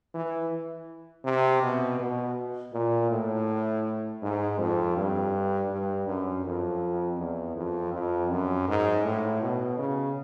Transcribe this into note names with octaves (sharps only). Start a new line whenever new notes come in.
E3
C3
B2
B2
A#2
A2
G#2
F2
G2
G2
F#2
F2
E2
F2
F2
F#2
G#2
A2
B2
C#3